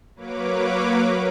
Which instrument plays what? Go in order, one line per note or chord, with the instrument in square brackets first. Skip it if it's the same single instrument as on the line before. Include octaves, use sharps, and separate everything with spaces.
[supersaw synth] F#3 A#3 B4 C#5 D6